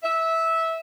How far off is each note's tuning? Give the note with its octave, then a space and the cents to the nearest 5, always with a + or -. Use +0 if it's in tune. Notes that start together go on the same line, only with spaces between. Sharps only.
E5 -15